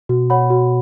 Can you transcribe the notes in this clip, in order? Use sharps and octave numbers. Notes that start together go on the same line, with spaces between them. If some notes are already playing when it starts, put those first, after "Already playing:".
B2 F#4
C#5 F#5 B5
F#4